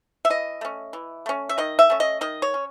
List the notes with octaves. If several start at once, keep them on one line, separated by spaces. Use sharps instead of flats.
E5
E3 D#5
A3 C#4
E3
A3 C#4
E5
D#3 D#5
E5
A3 C#4
D#5
D#3 D#5
C#5
C#4